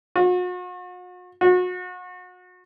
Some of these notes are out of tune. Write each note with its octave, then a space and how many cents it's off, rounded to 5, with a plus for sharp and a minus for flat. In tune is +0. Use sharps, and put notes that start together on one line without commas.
F#4 -45
F#4 -35